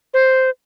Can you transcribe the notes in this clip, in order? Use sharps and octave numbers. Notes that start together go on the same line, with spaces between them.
C5